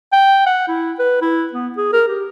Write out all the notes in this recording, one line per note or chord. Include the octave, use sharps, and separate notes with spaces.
G5
F#5
E4
B4
E4
B3
G#4
A#4
G4